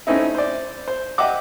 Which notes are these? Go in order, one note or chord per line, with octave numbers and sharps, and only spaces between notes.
A3 C4 C#4 D#4 E4
C5 D5
C5
G4 D#5 E5 F#5 D6